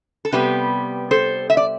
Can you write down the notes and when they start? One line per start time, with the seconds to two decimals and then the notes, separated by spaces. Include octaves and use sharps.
0.25 A4
0.32 C3 G3 B3 G4 B4
1.11 A4 C5
1.50 E5
1.57 D5